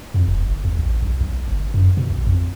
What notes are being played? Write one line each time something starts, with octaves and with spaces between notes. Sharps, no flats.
F2
E1
G1
D#2
A1
B1
B1
G1
F#2
B2
A#1
F2